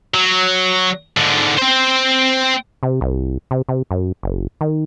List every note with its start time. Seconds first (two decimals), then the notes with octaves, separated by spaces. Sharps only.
0.14 F#3
1.17 G#2 D3
1.58 C4 C5
2.83 C3
3.01 C2
3.51 C3
3.69 C3
3.91 F#2
4.23 F#1
4.61 D#3